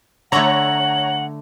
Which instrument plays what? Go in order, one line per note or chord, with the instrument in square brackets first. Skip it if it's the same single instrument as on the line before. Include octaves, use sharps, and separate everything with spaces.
[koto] D3 A3 [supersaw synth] C#5 A#5 [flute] F#5 [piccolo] F#7